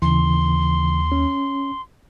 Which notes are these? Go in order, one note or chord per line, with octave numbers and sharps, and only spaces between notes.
D#2 C#3 E3 C6
C#4